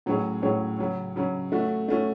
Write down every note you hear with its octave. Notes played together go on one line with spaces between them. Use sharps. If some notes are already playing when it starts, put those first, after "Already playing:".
A2 F#3 C#4 G#4 C#5
A2 F#3 C#4 G#4 C#5
C#3 F#3 C#4
C#3 F#3 C#4
A3 C#4 F#4
A3 C#4 F#4